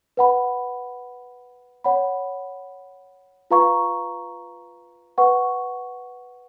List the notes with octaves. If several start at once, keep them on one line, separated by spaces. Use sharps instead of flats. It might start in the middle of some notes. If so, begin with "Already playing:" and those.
B4 F#5 B5
C#5 F#5 B5
F4 B4 F5 A#5 C#6
B4 F#5 C#6